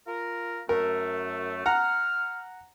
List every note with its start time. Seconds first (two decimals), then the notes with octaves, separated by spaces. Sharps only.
0.07 F4 A#4
0.69 F#2 A3 A#4
1.66 F#5 A#5 F6